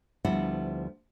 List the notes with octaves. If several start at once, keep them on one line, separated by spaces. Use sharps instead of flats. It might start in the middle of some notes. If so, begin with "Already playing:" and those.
D2 F3 G3 B3 E4 F#5